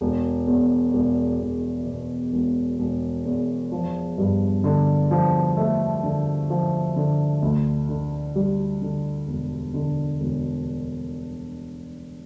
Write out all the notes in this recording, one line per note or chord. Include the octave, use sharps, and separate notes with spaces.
E1
E2
E1
E1
B2
E1
E1
E2
F3
G2
D3
F3
A3
D3
F3
D3
D2
D3
G3
D3
E1
D3
E1